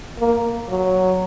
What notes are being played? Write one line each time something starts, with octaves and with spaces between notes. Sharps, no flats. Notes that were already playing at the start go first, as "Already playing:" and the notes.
A#3
F#3